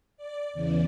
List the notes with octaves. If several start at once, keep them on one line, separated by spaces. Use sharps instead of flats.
D5
E2 C#3 E3 D5